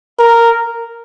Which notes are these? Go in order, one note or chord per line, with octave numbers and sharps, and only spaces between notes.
A#4